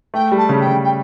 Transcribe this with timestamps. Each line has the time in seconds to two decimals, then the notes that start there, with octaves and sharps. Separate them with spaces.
0.14 A3 G5
0.32 G3
0.37 A5
0.49 C#3
0.60 G5
0.67 C#3
0.84 G5